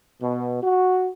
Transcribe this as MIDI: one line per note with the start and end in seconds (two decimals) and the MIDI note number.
0.20 0.58 47
0.61 1.09 66